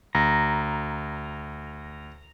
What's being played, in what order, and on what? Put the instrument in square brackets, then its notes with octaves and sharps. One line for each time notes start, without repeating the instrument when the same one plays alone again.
[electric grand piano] D2 [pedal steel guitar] A#5